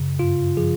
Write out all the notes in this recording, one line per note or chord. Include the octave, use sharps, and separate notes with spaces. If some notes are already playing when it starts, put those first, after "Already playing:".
Already playing: F#2 C#3
G2 F4
F3 G#4